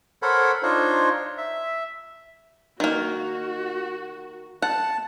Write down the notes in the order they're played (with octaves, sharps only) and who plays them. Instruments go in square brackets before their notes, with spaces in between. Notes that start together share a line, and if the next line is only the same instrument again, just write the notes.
[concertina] A4 A#4 C5 C#5 F#5 B5
D4 D#4 F4 C5 C#5
E5
[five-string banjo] D#3 A#3 [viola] F#4
[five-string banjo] F#5 [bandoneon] A5